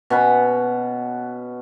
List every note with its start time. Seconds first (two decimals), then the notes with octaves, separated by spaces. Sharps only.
0.10 B2 C#4 F#5 B5